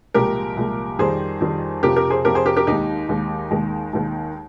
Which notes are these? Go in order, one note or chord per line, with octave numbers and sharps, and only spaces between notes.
C2 A#2 F3 G#3 G4 A#4
C2 A#2 F3 G#3
F2 D#3 G3 G#4 C5
F2 D#3 G3
F2 C3 F3 G4 A#4
G4 A#4
G#4 C5
F2 C3 F3 G4 A#4
G#4 C5
G4 A#4
G4 A#4
D#2 D#3 G#3 D#4 G4
D#2 D#3 G#3
D#2 D#3 G#3
D#2 D#3 G#3